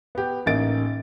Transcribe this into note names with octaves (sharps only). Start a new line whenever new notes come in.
B3 G4
A1 A#3 D#4 A6 D7